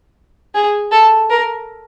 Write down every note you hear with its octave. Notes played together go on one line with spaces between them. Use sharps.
G#4
A4
A#4